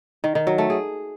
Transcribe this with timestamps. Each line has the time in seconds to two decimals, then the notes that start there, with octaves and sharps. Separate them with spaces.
0.24 D#3
0.35 D#3
0.47 F#3
0.58 A3
0.70 G#4